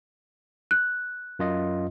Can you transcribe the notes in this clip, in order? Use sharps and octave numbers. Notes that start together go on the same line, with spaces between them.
F#6
F#2 F4 D#5